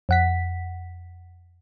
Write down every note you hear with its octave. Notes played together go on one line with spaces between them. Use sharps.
F2 F#5 B6